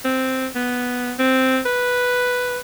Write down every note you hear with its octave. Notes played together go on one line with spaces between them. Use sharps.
C4
B3
C4
B4